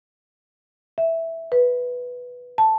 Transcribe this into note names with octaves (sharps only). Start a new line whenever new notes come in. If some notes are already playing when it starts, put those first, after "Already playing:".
E5
B4
A5